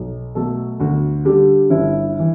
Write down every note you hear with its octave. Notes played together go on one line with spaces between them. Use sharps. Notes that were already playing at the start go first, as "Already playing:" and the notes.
Already playing: B1
B2 F#3 A3 A4
D2 F#4
D3 G3 G4
G1 E4
E3